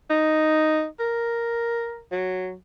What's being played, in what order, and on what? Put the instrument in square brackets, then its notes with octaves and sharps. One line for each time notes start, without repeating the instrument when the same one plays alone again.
[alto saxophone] D#4
A#4
F#3